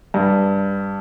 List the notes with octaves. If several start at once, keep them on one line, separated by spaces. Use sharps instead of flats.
G2